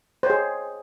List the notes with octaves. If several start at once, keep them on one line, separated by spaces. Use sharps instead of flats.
G#4 C5 C#5